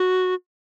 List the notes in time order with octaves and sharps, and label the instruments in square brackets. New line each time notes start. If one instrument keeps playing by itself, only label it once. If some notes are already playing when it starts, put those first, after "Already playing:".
Already playing: [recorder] F#4